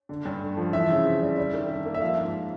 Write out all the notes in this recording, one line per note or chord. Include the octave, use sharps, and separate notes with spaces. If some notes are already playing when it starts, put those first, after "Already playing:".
D3
G2
A3
F3
E3 E5
C#3
C4
G3
G3
D#3
D4
A#3
E5
F3 F5
G#2